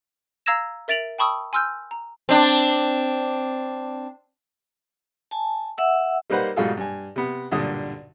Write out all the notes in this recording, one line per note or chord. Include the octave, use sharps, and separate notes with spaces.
F5 A#5 E6 G#6 A#6 E7
A#4 E5 A6 D7 F7 F#7
G5 A5 B5 C#6 D#6 E6
G#5 C6 E6 F6 G6
A#5
C4 D4
G#5 A5
E5 F#5 E6
G3 A#3 D#4 B4 C5 F#5
G#2 B2 G3 F4 G#4 A4
G2 G#5
C3 B3
B1 G2 A#2 D3 D#6